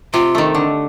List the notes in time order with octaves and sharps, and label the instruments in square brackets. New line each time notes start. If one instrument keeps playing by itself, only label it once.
[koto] C3 [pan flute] F4
[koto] D#3 A3
D3